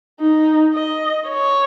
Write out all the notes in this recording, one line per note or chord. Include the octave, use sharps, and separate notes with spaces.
D#4
D#5
C#5